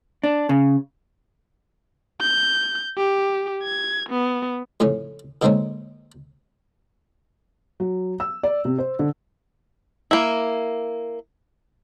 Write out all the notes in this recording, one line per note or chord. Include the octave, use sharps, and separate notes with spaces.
D4
C#3
G6
G4
G#6
B3
F2 A2 C#3 C#4
D3 D#3 G#3 A#3 C4 C#4
F#3
E6
D5
C3
C5
D3
A#3 E4